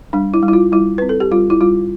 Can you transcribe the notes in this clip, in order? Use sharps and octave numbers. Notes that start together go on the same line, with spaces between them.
G3 D4
E4
G3
E4
F4
G3 E4
C4 B4
A4
G4
G3 F4
E4
G3 F4